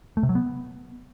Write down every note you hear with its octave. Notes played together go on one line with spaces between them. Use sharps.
A3
C3
F#3
B3